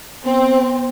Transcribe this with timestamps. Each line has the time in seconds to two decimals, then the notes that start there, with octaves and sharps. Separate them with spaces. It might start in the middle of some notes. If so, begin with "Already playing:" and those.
0.24 B3 C4